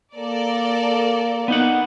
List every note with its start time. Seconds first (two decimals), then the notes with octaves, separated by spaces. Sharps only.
0.15 A#3 A4 A#4 D5
1.48 B3 D#4 F#5